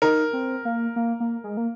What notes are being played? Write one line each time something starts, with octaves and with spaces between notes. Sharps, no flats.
D#4 A#4
C4
A#3
A#3
A#3
G#3
A#3